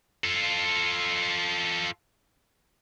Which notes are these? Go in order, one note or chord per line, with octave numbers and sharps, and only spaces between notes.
F4 A4